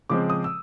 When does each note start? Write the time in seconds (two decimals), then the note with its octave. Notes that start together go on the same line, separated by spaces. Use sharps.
0.10 C#3 F3 G#3 C4 D6
0.30 D#6
0.44 E6